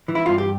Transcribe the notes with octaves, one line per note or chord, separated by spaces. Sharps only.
E3
E4
G2 F4
G4